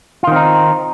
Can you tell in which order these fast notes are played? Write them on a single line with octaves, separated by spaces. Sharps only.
F4 D#3 C4 D#4